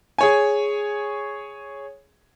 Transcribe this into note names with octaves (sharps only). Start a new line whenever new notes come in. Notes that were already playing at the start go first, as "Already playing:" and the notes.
G#4 C#5 G#5